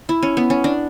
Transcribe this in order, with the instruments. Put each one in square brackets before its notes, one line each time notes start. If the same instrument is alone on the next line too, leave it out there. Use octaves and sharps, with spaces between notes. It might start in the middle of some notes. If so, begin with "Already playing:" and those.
[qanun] E4
C#4
B3
C#4
D4